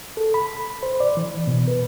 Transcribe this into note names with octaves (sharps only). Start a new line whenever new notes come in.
A4
B5
C5
D5
E3
B2
B4